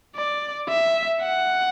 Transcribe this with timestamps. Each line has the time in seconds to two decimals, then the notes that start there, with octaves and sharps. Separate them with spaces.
0.16 D5
0.69 E5
1.21 F#5